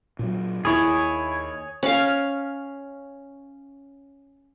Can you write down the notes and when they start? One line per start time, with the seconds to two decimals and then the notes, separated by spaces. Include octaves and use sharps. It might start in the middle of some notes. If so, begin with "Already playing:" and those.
0.19 A#2 F#3
0.65 D#2 E4 G#4 C#5
1.83 C#4 F5